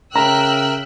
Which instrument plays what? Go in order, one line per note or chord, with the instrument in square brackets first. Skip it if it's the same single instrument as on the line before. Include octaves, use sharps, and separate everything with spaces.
[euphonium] C#3 [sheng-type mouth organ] A#4 E5 [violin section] G5 E6 F#6 [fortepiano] A#5